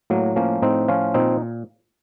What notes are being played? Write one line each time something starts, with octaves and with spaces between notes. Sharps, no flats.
A2 F#3 A#3
F3 A#3 C#4
A2 C4 D#4
F3 C#4 F4
A#2 C4 D#4